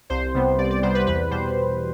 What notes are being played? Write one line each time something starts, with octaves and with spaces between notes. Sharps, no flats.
C2 C5
C3 G3 B3
C2 D5
D5
C3 G3 B3 C5
B4
E2 B4
B2 G3 C5